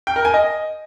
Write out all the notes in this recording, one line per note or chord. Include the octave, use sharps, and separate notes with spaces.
G5
A#4
G#5
D#5